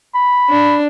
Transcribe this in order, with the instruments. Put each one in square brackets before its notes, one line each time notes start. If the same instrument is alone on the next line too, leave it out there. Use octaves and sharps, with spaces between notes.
[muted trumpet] B5
[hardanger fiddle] D4